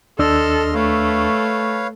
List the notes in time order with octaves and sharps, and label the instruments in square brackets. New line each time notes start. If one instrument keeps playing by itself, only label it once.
[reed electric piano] D#2 D4 E6 [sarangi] A4 [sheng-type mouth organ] D#5 C6 F6
[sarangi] A3 [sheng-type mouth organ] B4 C#5 F5